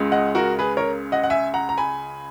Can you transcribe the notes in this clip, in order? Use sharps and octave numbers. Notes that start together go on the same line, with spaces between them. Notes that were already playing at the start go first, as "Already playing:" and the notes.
Already playing: C#2 C#3 G#3
D#5 F#5
F#4 A#4
G#4 B4
A#4 C#5
D#5 F#5
F#5
E5 G#5
F#5 A#5
A#5
G#5 B5